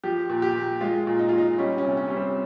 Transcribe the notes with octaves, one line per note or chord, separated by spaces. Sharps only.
F3 G4
A#2
G4
A#2
G#3 F4
A#2
D#4
F4
A#2 D#4
G3 C#4
C#4
C3
C#4
G3 C#4
C4